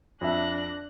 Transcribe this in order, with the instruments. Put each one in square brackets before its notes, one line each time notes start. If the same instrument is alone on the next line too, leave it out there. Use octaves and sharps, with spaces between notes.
[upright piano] F2 E5 [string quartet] D4 F#6 A#6